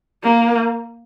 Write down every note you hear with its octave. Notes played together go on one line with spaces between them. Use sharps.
A#3